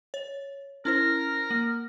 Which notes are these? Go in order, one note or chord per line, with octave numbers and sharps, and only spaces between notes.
C#5
C#4 E4 A#4 C5
A#3